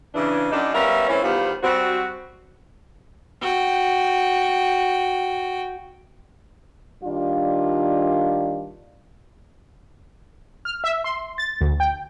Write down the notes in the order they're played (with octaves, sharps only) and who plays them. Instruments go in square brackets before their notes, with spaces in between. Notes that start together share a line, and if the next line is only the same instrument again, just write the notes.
[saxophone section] C#3 E3 D4
F#2 D4 D#4
G3 B3 C#4 A#4 E5 F5
E3 A3 C4 C#4
E2 D#3 G3 B3 F4 C5
G3 C4 F#4
[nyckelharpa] F#4 G5
[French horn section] D#3 G3 D4 F4
[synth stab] F6
E5
C6
A6
D2
G5